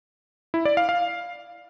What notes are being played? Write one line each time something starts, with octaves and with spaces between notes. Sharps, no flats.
E4
D5
F5
F5